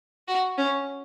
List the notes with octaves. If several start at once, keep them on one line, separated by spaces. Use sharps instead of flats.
F#4
C#4